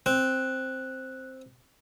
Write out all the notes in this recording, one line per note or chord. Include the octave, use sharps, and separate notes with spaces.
C4 F#6